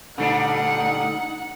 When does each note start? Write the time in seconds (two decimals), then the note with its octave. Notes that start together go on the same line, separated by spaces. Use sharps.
0.18 A#2 D3 G3 A3 D4 D#4 F#5